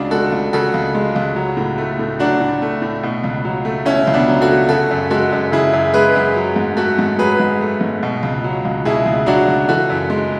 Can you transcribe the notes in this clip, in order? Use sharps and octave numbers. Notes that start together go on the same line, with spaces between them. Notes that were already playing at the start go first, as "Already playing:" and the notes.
Already playing: C#2 C#3 D4 F#4
G#3 F#4 A4
C#2
C#3 F#4 A4
C#2
G#3
C#2
F#3
A2
A3
A2
F#3 D4 F#4
A2
A3
A2
B2
C#2
F#3
A3
B2 C#4 E4
C#2
B3 D4
F#3
F#4 A4
A3
C#3 F#4 A4
F#2
G#3 F#4 A4
F#2
C#3 E4 G#4
F#2
G#3 G#4 B4
F#2
F#3
G#2
A3 F#4 A4
G#2
F#3 G#4 B4
G#2
A3
G#2
B2
C#2
F#3
C#2
B2 E4 G#4
C#2
F#3 D4 F#4
C#2
E3 F#4 A4
F#2
G#3